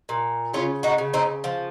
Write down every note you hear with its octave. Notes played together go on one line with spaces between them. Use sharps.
A#2
C#3 C#4 F4
D#4 F#4
C#3
C4 D#4
F3